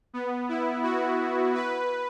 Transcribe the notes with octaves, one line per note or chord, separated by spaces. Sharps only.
B3
E4
F#4
B4